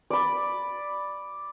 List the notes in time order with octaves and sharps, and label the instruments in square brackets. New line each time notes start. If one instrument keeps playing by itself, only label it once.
[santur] D5 B5